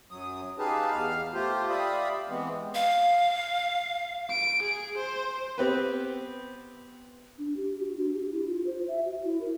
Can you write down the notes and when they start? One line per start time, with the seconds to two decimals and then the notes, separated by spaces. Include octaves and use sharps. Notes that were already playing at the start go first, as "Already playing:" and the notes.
0.11 F#2 F#3 D#6
0.59 D#4 G4 G#4 B4 F5 A5
0.91 E2 F5 F6
1.34 A3 F4 G4 C5
1.69 G4 D5 E5 F5 B5 D#6
2.29 E3 G#3 B3 C4
2.75 F5
4.30 D7
4.63 G#4
4.97 C5
5.58 B3 C4 G4 B4
7.38 D4
7.57 G4
7.80 F#4
7.97 D4
8.14 G4
8.32 E4
8.47 F4
8.67 C5
8.88 E5
9.06 F#4
9.24 E4
9.41 A#4